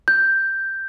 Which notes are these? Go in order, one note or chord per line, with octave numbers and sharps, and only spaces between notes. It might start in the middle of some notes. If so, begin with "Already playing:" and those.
G6